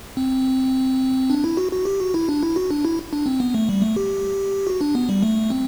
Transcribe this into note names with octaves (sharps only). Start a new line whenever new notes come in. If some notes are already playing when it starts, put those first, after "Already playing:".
C4
D4
E4
F#4
F#4
G4
F#4
E4
D4
E4
F#4
D4
E4
D4
C4
B3
A3
G3
A3
G4
F#4
D4
B3
G3
A3
C4